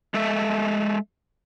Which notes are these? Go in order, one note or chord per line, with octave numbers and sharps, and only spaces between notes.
G#3 A4 E5